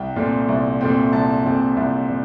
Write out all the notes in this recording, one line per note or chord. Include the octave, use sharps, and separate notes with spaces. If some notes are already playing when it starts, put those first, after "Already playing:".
Already playing: C2 G5
A#2 A3 C4
C2
A#2 A3 C4
C2 A5
A#2 A3 C4
C2
A#2